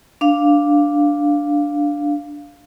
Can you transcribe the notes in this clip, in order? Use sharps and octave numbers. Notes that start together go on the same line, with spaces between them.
D4 F5